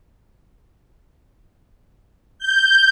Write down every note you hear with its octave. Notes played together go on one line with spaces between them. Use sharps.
G6